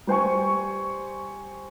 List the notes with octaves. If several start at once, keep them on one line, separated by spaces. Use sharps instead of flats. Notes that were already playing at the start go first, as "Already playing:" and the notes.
G3 C5 G#5 C#6